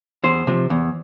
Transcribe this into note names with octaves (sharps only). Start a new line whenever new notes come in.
E2 C5
C3 F3
E2